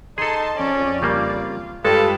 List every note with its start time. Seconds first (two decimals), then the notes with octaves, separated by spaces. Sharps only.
0.18 D#4 G#4 A4 A5 C6
0.56 F2 C#4 D5
1.02 C#3 G3 A#3 F4
1.85 G2 G#3 F4 G4 A4 B4